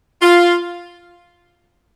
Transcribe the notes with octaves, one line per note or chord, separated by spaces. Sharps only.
F4